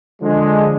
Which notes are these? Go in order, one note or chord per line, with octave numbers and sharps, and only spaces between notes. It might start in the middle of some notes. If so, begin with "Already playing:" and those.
D3 F3 G#3